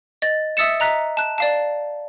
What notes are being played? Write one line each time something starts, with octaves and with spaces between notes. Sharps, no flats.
D#5 A6
E5 D#6 E6 A6 C#7 E7
D#5 A#5 F#6 B6
A5 F#6
D5 F5 A5